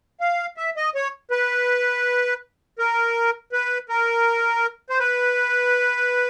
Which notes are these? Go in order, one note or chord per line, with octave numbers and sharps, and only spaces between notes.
F5
E5
D#5
C#5
B4
A#4
B4
A#4
C5
B4